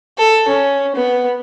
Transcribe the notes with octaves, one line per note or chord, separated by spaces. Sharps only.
A4
C#4
B3